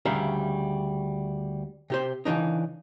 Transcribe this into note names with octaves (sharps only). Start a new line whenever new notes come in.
D2 C#3 G3 E5 F5 A#5
C3 G4 C5
C#3 E3 G3 D4 D#4